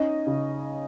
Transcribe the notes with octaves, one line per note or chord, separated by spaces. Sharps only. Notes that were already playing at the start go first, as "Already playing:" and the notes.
Already playing: C#4 D#4 D#5
C#3